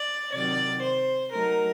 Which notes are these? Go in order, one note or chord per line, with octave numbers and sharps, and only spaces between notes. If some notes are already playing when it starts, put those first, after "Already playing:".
Already playing: D5
C3 D#3 F#3 D5
C5
F#3 A3 D#4 A#4